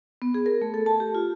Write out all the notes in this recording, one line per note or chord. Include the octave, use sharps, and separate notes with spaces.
B3
G#4
A#4
A3
A4
A5
G4
F4